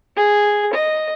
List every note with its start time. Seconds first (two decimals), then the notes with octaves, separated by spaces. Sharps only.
0.15 G#4
0.74 D#5